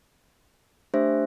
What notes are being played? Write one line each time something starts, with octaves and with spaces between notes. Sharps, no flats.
A3 D4 G4 C5 E5